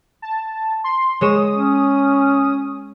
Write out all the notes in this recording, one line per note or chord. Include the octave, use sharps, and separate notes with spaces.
A5
C6
G#3 C#5 D#6 E7
C#4